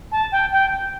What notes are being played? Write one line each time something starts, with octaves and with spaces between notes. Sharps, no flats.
A5
G5
G5